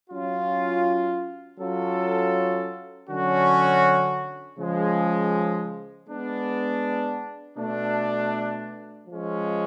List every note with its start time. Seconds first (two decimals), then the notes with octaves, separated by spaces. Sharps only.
0.10 F#3 C#4 F4
1.59 F#3 C#4 F4 A4
3.09 D3 F#3 C#4 F#4
4.59 C#3 F3 G#3
6.08 G#3 B3 D4
7.57 B2 A3 D4
9.07 F3 G#3 C#4